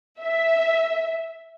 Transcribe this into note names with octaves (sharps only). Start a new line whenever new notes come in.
E5